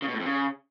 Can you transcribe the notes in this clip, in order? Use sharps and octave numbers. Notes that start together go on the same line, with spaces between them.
C#3
B2
A2
F2
C#3